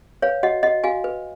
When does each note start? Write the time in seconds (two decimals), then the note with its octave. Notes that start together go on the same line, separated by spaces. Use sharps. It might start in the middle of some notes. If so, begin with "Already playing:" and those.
0.22 B4 C#5 F5
0.43 F#4 D#5 F#5
0.63 F#4 D#5 F#5
0.84 F#4 F5 G#5
1.04 B4